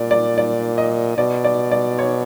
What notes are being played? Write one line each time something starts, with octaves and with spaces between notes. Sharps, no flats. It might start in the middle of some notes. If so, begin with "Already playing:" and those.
Already playing: A#2 D5
D5
D5
D#5
B2 D5
D5
D5
C#5